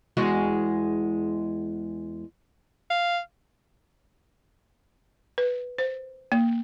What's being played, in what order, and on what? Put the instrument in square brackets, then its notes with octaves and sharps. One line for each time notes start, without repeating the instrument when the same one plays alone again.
[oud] E2 G#3 F#4
[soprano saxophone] F5
[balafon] B4
C5
A#3